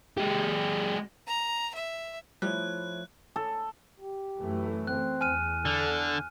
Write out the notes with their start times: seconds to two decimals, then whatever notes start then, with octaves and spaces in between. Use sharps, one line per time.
0.18 G#3 G4
1.28 A#5
1.75 E5
2.42 F3 G3 A3 E4 C#5 F#6
3.36 A4
4.00 G4
4.38 F#2 E3 A3
4.87 C4 F#6
5.21 E2 G#5 F6 D#7
5.65 D3 A4